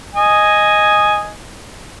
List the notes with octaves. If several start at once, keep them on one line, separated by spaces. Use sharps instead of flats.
D#5 G#5